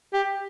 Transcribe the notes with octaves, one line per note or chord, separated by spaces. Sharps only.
G4